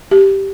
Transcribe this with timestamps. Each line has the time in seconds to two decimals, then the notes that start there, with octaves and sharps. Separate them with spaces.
0.11 G4